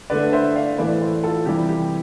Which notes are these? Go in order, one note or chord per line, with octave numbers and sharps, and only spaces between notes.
D3 A3 B4 D5
C5 E5
D5 F5
A2 E3 A3 B4 D5
A4 C5
F4 A4
C3 E3 G3 G4
G4